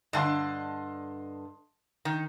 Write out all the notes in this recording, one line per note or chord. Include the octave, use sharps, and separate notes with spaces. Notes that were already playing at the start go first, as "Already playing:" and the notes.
G2 D3 D#5 A5 C6
D#3